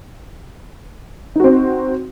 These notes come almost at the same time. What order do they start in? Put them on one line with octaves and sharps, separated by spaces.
D#4 F#4 C4